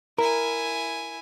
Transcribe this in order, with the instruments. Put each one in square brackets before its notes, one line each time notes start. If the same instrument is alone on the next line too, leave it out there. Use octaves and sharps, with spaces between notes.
[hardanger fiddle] E4 G#5 [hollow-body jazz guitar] A#4